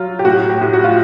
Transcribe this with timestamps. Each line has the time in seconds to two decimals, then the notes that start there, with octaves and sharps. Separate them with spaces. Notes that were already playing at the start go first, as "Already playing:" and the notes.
Already playing: F#3 F4
0.19 G4
0.25 A2 F#4
0.50 G4
0.62 A2
0.73 F#4
0.84 F4